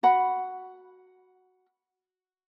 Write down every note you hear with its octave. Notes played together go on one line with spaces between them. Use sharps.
F#4 F#5 B5